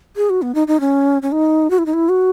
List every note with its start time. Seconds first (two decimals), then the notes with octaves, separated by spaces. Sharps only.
0.17 G#4
0.30 F#4
0.42 B3
0.55 D#4
0.68 D#4
0.80 C#4
1.22 C#4
1.32 D#4
1.70 F#4
1.79 E4
1.86 D#4
1.94 E4
2.09 F#4